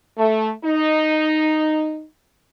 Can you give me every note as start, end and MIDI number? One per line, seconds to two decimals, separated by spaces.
0.18 0.50 57
0.65 2.03 63